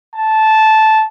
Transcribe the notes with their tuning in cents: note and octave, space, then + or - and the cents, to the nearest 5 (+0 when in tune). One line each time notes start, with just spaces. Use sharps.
A5 -10